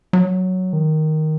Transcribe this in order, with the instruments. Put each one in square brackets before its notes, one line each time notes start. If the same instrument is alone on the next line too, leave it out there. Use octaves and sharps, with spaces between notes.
[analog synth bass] F#3
D#3